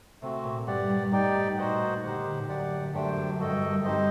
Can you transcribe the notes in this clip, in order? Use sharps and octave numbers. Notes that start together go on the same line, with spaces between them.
C3 A3 C4 F#4
A#2
G2 G4 D5 F#5
G2
A2 D#4 G4 D5 G5
A#2 D#4 F#4 C5 D#5 F#5
D3 D#4 G4 C5 F#5
D3
A#2
A2
F#2 G4 D5 F#5
F#2 A3 D4 G4 C5 G5
F#2
G2 F#4 A4 D#5 G5
G2
F#2
G2 C4 D#4 G4 C5 D#5